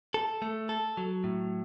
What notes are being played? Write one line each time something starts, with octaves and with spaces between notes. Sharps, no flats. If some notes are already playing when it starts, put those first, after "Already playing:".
A4
A3
A4
F#3
A2